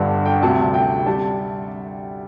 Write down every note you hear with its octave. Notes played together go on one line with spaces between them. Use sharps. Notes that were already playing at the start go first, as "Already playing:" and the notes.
Already playing: G1 G2 D3 G3
G5
D2 C3 G3 A5
G5
G3 A5